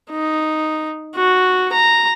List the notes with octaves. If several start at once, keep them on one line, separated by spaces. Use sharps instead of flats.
D#4
F#4
A#5